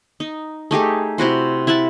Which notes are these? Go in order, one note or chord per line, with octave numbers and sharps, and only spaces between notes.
D#4
A3 D#4 G4 G#4
C3 E4 F#4 C5
E4 E5 F#5 A5